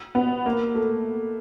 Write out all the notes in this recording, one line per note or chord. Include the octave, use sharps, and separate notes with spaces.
B3
A#3
A3